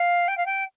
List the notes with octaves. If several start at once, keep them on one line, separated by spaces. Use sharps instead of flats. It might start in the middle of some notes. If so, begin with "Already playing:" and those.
Already playing: F5
G5
F5
G5